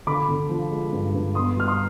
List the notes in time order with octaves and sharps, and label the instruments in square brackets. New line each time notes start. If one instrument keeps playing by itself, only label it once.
[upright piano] D3 B5 D6
D3
F3
G#3
G2
G2
B3 C6 D#6
G3 F6
C6 D#6